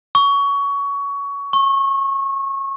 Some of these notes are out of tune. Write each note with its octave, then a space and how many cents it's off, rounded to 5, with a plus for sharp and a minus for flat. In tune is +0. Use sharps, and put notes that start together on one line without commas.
C#6 +20
C#6 -25